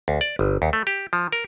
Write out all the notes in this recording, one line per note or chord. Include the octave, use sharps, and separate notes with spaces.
D2
D5
G1
D#2
A3
G4
F3
A#4